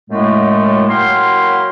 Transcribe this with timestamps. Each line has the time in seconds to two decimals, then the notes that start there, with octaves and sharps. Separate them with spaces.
0.10 F#2 A2 G#3 A3
0.89 F#3 A#3 E4 A#4 G5 C6